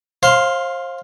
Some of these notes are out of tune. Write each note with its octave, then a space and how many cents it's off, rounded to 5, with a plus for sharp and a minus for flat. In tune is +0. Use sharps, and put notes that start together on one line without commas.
C5 +35 F5 +5 C6 +0